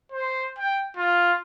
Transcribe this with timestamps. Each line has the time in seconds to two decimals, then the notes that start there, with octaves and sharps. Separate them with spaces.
0.12 C5
0.58 G5
0.97 F4